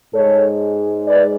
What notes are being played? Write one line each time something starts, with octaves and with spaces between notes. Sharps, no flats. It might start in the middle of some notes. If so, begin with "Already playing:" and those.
G#2 G#3 A4 C#5
B4 D5